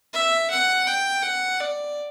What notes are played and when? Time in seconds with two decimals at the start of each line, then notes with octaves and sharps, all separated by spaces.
0.14 E5
0.50 F#5
0.87 G5
1.23 F#5
1.60 D5